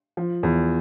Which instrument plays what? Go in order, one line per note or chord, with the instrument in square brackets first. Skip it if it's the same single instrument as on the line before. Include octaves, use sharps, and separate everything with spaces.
[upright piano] F3
E2